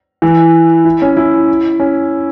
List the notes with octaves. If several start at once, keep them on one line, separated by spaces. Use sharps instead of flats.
E3
E4
C#4
E4
C#4